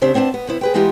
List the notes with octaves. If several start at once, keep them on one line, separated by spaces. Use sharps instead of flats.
C#3 C4 D4 G4 E5
B3 C4 D4 G5 A5
B3
C3 B3 E4
G#4 B4 G5
E3 G#3 B3 D#4 F4 G4